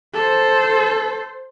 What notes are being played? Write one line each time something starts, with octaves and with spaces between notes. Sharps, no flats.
A4 C5